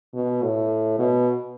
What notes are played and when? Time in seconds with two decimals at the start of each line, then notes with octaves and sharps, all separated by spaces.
0.14 B2
0.42 A2
0.99 B2